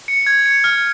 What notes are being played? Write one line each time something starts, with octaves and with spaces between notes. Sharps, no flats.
C#7
G#6
C#7
F6